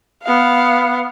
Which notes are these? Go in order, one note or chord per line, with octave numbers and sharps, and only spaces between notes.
B3 F5